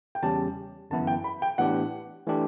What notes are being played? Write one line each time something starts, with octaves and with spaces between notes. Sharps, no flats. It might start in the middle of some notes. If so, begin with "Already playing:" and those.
G5
E2 C#3 G3 C#4 G4 A5
G1 F#2 E3 B3 E4 A5
G5
B5
G5
A2 E3 B3 D4 G4 F#5
E3 A3 D4 G4